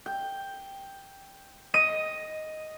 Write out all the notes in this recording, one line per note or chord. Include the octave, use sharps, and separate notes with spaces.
G5
D#5 D#7